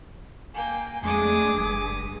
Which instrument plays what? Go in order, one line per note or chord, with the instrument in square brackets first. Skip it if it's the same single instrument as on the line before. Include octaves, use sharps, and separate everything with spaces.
[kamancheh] A#3 G5 [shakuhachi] G#5
[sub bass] F2 [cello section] G#3 A3 D4 [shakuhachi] G#4 [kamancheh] D6 D#6
[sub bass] F#1 [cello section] G2